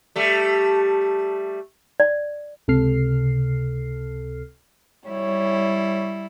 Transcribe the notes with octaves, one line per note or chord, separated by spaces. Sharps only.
G3 A3
D5
C#2 C3 A4 F6 C7
G3 E4 C#5